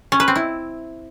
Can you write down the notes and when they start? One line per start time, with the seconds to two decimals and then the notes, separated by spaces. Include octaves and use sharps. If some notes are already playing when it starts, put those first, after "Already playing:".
0.12 C#4
0.20 B4
0.28 C4
0.36 E4